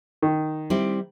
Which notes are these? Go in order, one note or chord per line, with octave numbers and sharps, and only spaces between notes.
D#3
G3 C4 E4